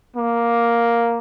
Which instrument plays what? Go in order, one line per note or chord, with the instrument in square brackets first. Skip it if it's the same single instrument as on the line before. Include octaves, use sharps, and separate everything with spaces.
[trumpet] A#3